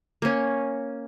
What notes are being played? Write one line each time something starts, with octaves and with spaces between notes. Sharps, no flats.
A#3 C#4